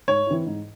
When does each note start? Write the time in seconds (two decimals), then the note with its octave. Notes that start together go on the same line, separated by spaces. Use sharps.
0.08 G#2 C#5
0.27 E3 C4 E4
0.46 G#2